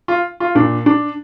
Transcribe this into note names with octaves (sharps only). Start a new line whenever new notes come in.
F4
F4
A#2 D4
D4